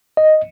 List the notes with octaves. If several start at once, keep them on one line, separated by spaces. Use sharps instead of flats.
D#5